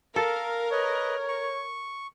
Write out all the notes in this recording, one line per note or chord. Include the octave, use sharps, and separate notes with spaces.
A4 A#4 F5
B4 C#5 D#5
C#6